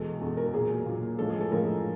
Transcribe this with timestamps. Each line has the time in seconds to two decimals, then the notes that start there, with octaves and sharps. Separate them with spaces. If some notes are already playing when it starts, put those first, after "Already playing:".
Already playing: E2 B2 G#3 A4
0.21 E2 B2 G#3
0.37 A#4
0.53 A#2 F#3 G#4
0.86 A#2 F#3
1.18 A2 F3 G#3 A4
1.30 G#4
1.41 A4
1.51 A2 F3 G#3 A#4